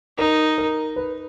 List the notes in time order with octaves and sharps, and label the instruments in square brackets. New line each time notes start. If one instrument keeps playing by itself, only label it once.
[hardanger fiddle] D#4 [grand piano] A#4
[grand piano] A#4
B4